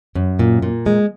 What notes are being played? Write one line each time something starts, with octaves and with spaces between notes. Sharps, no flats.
F#2
A#2
A#2
G#3